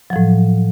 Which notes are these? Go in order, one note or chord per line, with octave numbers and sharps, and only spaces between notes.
A2 F3 F#3